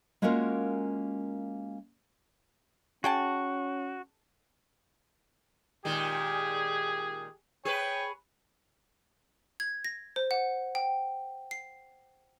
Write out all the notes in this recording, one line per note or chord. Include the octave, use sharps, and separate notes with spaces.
G#3 A#3 C#4 F4 F#4 A#4
C#4 F#4 G#4 G5 A5
A#2 D#3 G#3 G4 G#4
G#4 B4 C#5 G5
G#6
A#6
C5
F#5
G5
C7